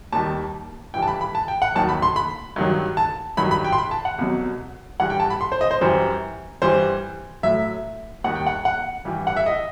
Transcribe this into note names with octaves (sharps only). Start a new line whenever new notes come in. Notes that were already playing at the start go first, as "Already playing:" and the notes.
D#2 D#3 G3 A5
G2 E3 G3 G5
A5
B5
B5
A5
G5
F#5
D#2 D#3 F#3 A5
B5
C6
B5
G2 D#3 F#3
A5
G2 D#3 F#3 B5
B5
G5
C6
B5
A5
F#5
C2 B2 F#3
G2 E3 G3 F#5
G5
A5
B5
C6
C5
D#5
C5
F#2 E3 G3 C5
G2 E3 G3 C5
A2 F#3 E5
D#2 D#3 G3 F#5
G5
F#5
F#5
G2 E3 G3
F#5
E5
D#5